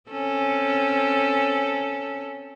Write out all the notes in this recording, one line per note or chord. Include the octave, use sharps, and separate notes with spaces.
C4 C#4 A4